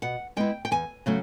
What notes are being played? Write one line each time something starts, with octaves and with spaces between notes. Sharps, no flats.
B2 F#5
G#3 B3 E4 G5
G5
E2 G#5
C#3 F#3 A3 C#4